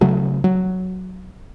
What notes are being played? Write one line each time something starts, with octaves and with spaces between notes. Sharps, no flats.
C#3 F#3 A3
F#3